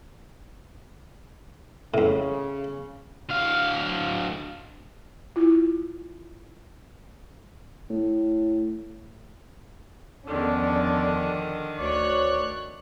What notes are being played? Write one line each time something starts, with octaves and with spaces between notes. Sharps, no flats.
F2 A2 C#3
D2 F5
E4 F4
A2
E2 D3 D#3 F3 C#4 D4
D2 C#5 D5 F#6